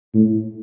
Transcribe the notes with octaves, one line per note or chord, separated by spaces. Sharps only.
A2